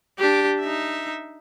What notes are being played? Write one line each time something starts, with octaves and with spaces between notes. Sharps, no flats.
D4 G4
D#4 E5